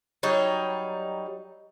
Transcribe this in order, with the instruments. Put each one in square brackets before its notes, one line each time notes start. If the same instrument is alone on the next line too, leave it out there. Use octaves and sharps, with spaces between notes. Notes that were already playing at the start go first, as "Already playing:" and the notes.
[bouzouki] F#3 G3 D#4 C#5